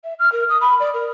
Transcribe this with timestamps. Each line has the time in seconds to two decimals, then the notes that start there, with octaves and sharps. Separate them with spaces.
0.04 E5
0.19 F6
0.32 A#4
0.49 D#6
0.61 B5
0.79 D5
0.94 A#4